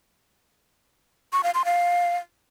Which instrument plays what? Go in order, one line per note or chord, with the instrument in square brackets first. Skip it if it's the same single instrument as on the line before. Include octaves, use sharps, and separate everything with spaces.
[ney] C#6
F5
C6
F5